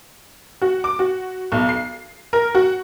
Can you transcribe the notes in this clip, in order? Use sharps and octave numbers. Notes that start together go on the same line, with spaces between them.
F#4
D6
F#4
B1
C7
A#4
F#4